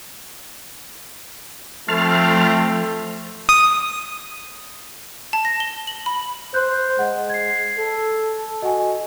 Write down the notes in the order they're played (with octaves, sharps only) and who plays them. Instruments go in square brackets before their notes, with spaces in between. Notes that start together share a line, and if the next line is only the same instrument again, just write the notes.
[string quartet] F3 [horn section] A3 C4 [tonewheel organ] A5 C6 F6
[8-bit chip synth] D#6
[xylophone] A5
A#6
G7
F#7
B5
[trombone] C5 [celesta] F#6 G6
[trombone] G#3 [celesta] D#5 F#5
[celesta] G#6 C7
[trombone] A4
[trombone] F#4 [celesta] D#5 G#5